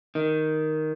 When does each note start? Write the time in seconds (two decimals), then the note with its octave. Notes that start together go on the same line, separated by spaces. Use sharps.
0.15 D#3